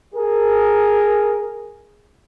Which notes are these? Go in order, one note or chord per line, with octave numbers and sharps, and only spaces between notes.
G#4 A#4